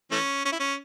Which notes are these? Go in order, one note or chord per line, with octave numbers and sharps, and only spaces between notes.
E3 A3 C#4
C#4
E4
C#4